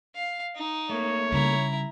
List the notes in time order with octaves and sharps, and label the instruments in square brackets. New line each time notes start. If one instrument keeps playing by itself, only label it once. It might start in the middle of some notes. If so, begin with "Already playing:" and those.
[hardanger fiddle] F5
D#4
[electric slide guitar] A3 A#3 [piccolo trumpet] C#5
[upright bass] C#3 G3 [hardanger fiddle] E4 A#5